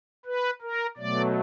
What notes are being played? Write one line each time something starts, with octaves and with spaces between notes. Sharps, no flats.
B4
A#4
B2 F#3 A3 D5